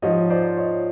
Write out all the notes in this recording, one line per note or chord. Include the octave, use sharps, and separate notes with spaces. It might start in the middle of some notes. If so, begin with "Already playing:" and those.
G#2 F3 C#5 D#5
C5 D5
C#5 D#5